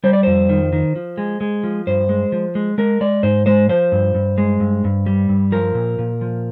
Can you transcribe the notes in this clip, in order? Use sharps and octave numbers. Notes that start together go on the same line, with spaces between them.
G3 C5
D5
F2 C5
D#3
D#3
F3
G#3
G#3
F3
G2 C5
G#3
F3
G#3
G#3 A#4
G#3 D5
G#2 C5
G#3 C5
F3 C5
G2
G2
G#3
G2
G2
G3
G2
F3 A#4
A#2
A#2
F3